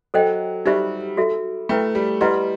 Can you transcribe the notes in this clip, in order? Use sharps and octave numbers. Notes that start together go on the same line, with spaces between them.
F#3 A4 C5 D#5 G5
G3 D#4 G4 C5 E5 B5
F#4 A4 E5
A3 E4 B4 E5 G5 B5
G3
G3 E4 B4 D#5 F#5 C6